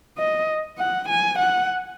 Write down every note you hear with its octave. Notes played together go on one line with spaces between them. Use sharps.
D#5
F#5
G#5
F#5